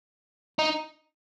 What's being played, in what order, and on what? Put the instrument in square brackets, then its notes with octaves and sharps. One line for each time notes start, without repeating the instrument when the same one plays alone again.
[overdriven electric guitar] D#4